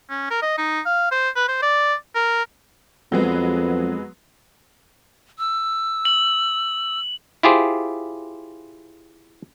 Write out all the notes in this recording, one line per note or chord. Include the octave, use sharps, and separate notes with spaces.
C#4
A#4
D#5
D#4
F5
C5
B4
C5
D5
A#4
F2 F#3 G#3 B3
E6
F#7
E4 F4 G4 G#4 C5